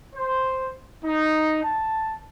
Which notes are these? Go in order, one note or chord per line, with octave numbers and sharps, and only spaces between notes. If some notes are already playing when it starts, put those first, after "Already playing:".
C5
D#4
A5